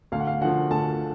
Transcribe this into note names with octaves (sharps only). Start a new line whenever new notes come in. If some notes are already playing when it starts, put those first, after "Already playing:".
D2 F5
F#5
F5
D3 F3 F#4 F#5
D2 A4 A5